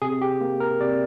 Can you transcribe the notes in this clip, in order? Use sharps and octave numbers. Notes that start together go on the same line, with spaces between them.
C3 G#4
G4
A#3
A#4
C3 D5